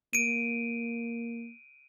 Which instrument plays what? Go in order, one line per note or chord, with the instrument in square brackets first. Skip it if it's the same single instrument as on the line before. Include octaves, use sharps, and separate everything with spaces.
[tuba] A#3 [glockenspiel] D7 D#7